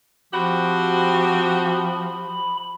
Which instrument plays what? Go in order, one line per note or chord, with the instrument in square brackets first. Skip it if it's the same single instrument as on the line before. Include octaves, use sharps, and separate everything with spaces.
[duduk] F3 [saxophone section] C4 F#4 G4 [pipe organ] B5